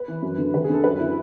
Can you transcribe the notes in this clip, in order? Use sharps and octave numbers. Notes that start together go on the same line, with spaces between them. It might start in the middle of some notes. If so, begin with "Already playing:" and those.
Already playing: B4
E3
F#2
D3
D2 B4
G#4
D3 A4
F#2 B4
D3 E4